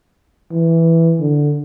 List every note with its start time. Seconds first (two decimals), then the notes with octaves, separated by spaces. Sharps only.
0.52 E3
1.20 D3